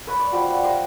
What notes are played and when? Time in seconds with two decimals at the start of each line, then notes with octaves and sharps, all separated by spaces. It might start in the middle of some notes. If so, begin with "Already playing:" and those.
0.07 B4 C#5 B5 C#6
0.19 D5
0.32 F3 G3 F#4 B5
0.50 F5 F#5
0.63 G4 C5 A#5 D6